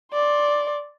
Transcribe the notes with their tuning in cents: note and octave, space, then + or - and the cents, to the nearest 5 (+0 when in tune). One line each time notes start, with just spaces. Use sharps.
D5 +0 C6 +20